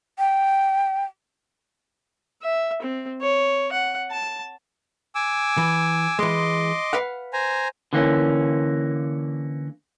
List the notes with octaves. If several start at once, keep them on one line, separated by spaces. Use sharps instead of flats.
G5
E5
C4
C#5
F#5
A5
G#5 D6 E6
E3
E3 G#3 D#5 C6 D6
B4 F5 F#5
C5 G#5 A#5
D3 E3 A#3 C#4